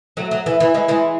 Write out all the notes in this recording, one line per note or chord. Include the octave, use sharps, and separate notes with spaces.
F#3 A3
F#3
E3
E3
E3 G#3
E3 G#3